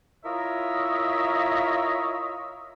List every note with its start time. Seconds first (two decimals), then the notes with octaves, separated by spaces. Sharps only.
0.25 E4 F4 A#4 C#5 D#5 E5